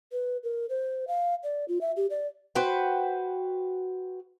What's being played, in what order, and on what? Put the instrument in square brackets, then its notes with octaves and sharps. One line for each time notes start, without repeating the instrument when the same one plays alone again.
[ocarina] B4
A#4
C5
F5
D5
F4
E5
G4
D5
[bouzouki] F#4 B4 C5 G5